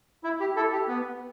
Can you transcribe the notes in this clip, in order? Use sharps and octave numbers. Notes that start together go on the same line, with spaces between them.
E4
G4
E4 A4
G4
B3